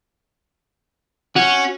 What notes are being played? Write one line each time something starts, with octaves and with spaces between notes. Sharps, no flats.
C#4 F#4